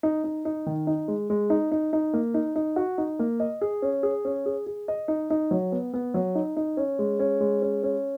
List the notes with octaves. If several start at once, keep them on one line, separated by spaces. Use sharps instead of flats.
D#4
D#4
D#4
D#3
D#4
G#3
G#3
D#4
D#4
D#4
A#3
D#4
D#4
F#4
D#4
A#3
D#5
G#4
C#4
G#4
C#4
G#4
G#4
D#5
D#4
D#4
F#3
B3
B3
F#3
D#4
D#4
C#4
G#3
C#4
G#3
C#4
C#4